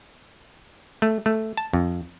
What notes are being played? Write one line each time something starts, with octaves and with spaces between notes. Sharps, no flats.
A3
A3
A5
F2